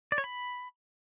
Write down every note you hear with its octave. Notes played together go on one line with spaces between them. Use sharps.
D5
C#5
B5